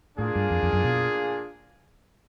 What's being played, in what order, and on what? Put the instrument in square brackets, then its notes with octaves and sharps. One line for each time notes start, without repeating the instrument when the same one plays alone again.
[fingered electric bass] A2 [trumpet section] A#3 D4 F4 G#4
[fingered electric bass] G2
F2
F2
F#2
B2